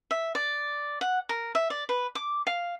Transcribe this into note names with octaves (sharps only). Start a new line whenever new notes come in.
E5
D5
F#5
A#4
E5
D5
B4
D6
F5